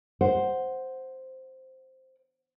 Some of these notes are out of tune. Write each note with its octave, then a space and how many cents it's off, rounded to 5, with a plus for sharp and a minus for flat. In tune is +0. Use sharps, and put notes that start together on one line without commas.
C5 +0 F#5 +0